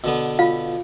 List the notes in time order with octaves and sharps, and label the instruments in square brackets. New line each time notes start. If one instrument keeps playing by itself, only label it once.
[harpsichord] B2 D3 B3
[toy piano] F4 F5